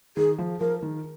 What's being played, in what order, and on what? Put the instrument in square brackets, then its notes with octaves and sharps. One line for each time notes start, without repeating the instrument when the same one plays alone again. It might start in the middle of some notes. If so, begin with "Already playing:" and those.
[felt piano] D#3 [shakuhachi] G#4
[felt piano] F3
[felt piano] F3 [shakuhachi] A#4
[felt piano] D#3